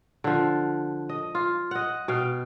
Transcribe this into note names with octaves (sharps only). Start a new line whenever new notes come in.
D3 F3
D#5
F4
D#5 F#5
B2 F5 G5